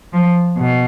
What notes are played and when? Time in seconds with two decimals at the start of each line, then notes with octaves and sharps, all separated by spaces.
0.13 F3
0.57 B2